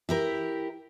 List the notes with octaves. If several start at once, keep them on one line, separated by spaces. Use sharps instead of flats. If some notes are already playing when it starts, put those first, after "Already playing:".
E4 G4 A#4